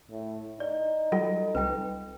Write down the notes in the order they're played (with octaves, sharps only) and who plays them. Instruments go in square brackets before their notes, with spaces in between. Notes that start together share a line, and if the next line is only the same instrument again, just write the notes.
[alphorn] A2
[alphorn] D#4 [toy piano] D5
[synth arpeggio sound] F#3 G3 [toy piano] F4 A4
[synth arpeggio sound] C2 G3 [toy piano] B4 G5